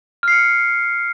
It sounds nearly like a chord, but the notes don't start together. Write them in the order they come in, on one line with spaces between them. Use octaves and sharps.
F6 C7 C#7